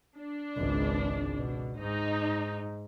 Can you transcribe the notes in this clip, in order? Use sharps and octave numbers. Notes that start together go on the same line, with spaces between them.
D4
G#1 C#2
B2
G#2 D#4